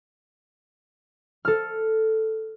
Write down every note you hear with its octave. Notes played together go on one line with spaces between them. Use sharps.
A4 F6